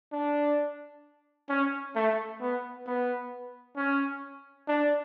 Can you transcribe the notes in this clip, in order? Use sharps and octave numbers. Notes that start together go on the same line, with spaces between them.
D4
C#4
A3
B3
B3
C#4
D4